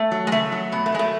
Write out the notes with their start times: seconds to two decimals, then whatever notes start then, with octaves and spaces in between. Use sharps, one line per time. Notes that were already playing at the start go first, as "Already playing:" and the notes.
Already playing: A3
0.11 F#3
0.27 G#3
0.32 C#3 A3
0.52 F#3
0.72 B2 B3
0.86 A3
0.92 F#3 G#3
0.99 A3